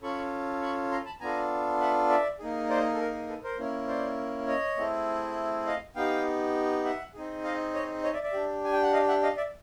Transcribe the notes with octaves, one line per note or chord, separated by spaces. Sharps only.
C#4 F4 A4 B5 C#6
B5 C#6
A#5 C6
A5 B5
B3 D4 F4 A4 G#5 A#5
E5 F#5
D5 E5
A#3 D#4 G#4
C5 D5
A4
A#4
A4 B4
A#4 C5
A#3 C#4 E4
C5 D5
C#5 D#5
A3 C4 E4 G#4
D#5 F5
B3 D#4 G4 F5 G5
E5 F#5
C4 D#4 G#4
D#5 F5
C#5 D#5
C#5 D#5
D5 E5
D5 E5
D4 G4
G#5
G5
F#5
D#5 F5
E5 F#5
D#5 F5
D5 E5